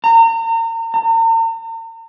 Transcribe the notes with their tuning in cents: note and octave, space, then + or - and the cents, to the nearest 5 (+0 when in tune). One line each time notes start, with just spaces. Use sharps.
A#5 -35
A#5 -45